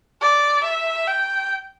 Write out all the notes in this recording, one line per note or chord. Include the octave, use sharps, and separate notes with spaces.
D5
E5
G5